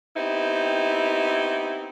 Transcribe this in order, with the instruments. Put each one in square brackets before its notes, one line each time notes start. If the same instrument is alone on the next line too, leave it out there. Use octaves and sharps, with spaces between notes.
[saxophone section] B3 C4 D#4 E4 G4